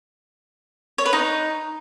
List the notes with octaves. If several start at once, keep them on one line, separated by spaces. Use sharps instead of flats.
C#5
B4
D#4